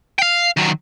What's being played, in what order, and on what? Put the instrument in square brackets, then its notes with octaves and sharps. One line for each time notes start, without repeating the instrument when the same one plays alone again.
[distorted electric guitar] F5 G5
D#3 F#3